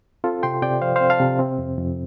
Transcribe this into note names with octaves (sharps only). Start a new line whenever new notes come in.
C4 F4 A4
C3 G5 C6
C3 D5 G5
F3 C5 F5
C4 C5 F5
F5 A5
C3
C4
F2
F2